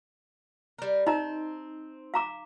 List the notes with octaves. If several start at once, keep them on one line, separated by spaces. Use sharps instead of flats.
G3 A#4
C4 D#4 D#5 A#5
F5 A#5 D6